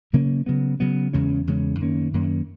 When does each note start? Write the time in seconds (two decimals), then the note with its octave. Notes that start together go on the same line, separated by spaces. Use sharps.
0.13 C#3 F#3 A#3 C#4
0.46 C#3 F#3 B3
0.80 C#3 F#3 B3
1.13 E2 C#3 G#3 C#4
1.47 E2 C#3 G#3 C#4
1.81 F#2 D#3 A#3 C#4
2.13 F#2 D#3 A#3 C#4